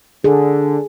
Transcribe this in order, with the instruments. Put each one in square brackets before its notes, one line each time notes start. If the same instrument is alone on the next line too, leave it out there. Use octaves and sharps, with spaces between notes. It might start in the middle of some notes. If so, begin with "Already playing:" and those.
[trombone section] D3 [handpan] G#4